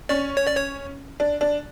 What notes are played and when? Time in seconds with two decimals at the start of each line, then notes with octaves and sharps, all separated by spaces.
0.09 C#4 D5
0.37 C#5
0.47 D5
0.56 C#5
1.20 D4
1.41 D4